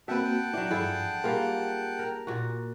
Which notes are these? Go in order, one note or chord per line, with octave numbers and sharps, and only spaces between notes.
A#3 C4 F#4 B4 E5 F#5 G5 A5
F#3 D4 E4
G2 F3 E4 G#4 A4
G3 A#3 F4 G#4
A#4
A#2 F#4